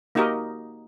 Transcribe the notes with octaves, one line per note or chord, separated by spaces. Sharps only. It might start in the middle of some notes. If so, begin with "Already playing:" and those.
A#3 D#4 F#4 G4 A#4 D#5